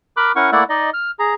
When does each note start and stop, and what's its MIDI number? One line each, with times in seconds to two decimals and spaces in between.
0.17 0.32 70
0.17 0.32 83
0.17 0.32 86
0.17 0.32 90
0.36 0.50 61
0.36 0.50 64
0.36 0.50 70
0.36 0.50 78
0.36 0.50 85
0.52 0.64 57
0.52 0.64 58
0.52 0.64 64
0.52 0.64 74
0.52 0.64 76
0.52 0.64 78
0.69 0.90 63
0.69 0.90 74
0.69 0.90 75
0.94 1.11 89
1.19 1.34 68
1.19 1.34 82